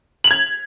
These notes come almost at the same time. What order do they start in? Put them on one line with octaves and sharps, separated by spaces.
F#7 F7 G#6